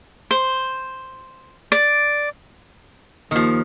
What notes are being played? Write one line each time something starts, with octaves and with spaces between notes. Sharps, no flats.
C5
D5
D#2 D#3 F3